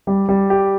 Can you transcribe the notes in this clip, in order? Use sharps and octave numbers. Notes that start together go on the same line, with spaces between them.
G3
G3
G4